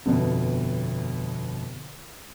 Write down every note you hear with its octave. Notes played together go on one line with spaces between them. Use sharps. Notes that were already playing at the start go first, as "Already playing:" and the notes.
G1 F2 B2